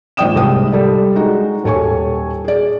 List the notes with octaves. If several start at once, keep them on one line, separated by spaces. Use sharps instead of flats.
G#1 A#2 D5 G5 D#6 E7
C2 G#2 D#6
G3 A4 D5
G#3 D#4 F#4
D#1 A4 C#5 G#5 C#6
G#4 D5